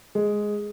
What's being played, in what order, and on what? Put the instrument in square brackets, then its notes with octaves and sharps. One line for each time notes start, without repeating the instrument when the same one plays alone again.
[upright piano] G#3